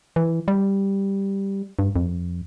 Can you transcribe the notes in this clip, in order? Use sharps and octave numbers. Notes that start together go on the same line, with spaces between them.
E3
G3
G2
F2